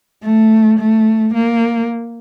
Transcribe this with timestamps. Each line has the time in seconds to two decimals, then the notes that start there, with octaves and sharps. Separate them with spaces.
0.23 A3
0.79 A3
1.34 A#3